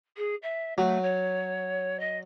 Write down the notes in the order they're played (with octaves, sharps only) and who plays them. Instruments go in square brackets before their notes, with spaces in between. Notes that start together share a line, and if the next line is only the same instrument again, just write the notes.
[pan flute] G#4
E5
[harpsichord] F#3 [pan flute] A3
[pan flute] C#5
D#5